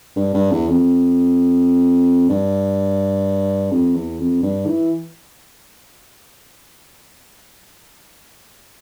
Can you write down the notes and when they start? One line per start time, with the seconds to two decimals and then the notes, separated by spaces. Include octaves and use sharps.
0.16 G2
0.34 G2
0.52 E2
0.69 F2
2.29 G2
3.72 F2
3.95 E2
4.19 F2
4.42 G2
4.66 E3